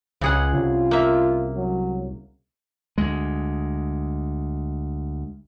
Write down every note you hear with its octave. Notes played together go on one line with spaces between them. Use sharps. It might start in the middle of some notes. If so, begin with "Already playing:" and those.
C#2 C#3 G#4 F#5
C2 F4
A#3 E5
F#3
D2 G#3